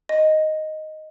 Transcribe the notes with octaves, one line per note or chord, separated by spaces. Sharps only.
D#5